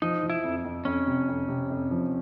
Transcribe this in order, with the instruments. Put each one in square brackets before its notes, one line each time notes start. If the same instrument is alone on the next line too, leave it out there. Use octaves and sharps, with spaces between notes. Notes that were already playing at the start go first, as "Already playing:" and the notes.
[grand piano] F3 [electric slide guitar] D#4
[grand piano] F3
[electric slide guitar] E4
[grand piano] F2
F2
[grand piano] F2 [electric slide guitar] C#4
[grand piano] C3
F2
C3
F2
F3